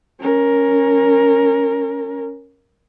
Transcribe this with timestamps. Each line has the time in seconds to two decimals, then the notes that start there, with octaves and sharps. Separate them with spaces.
0.20 C#4 A#4